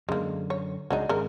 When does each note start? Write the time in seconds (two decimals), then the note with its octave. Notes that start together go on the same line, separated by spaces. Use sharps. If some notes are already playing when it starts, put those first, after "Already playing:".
0.09 F#2 D3 G#3 A#3
0.50 C#5
0.90 C#2 F#3 G#3 D4 D#4
1.09 G#1 C#3 A#4